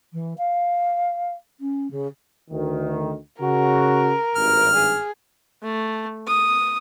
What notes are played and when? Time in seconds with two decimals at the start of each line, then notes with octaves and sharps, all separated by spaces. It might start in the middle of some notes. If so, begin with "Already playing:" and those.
0.13 E3
0.38 F5
1.60 C#4
1.91 C#3
2.51 D2 D#3
3.40 C#3 F#4 A#4
4.36 G#1 G2 F6
4.74 G#4
5.62 A3
6.27 D#6